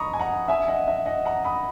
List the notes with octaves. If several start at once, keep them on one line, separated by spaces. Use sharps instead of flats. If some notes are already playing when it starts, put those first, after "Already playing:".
Already playing: D#5 A#5 B5 C#6 D#6
G#5
F#5 A#5
E5 G#5
D#5 F#5
E5
D#5 F#5
F#5 A#5
B5 D#6